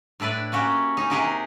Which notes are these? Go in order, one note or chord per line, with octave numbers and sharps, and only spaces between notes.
A2 D4 E4 B4 D5
A#3 C#4 F#4 G4
C#4 D#4
C3 D#4 G4 G#4 A#4 F#5